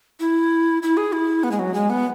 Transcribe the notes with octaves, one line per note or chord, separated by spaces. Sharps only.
E4
E4
G#4
E4
B3
G#3
F#3
G#3
B3